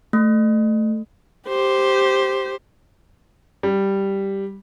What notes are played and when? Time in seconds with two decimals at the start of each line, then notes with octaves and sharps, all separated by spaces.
0.13 A3
1.48 G4 C5
3.63 G3